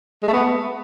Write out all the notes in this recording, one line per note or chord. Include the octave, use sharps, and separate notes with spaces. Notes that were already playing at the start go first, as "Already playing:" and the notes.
G#3
A3
B3